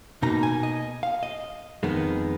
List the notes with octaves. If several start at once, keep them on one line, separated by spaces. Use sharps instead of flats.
B2 A#3 D#4 A#5
G#5
D#5
F5
D#5
F2 D#3 G#3 B3